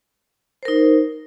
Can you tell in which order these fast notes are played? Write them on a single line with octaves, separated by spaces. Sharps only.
C5 A#4 D#4